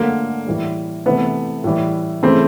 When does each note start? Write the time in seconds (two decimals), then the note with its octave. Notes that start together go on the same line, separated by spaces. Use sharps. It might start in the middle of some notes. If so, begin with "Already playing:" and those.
Already playing: D3 F#3 A3 A#3
0.47 A2 E3 G3
1.06 C3 E3 A3 B3
1.64 A2 E3 G3
2.23 C#3 E3 A3 C4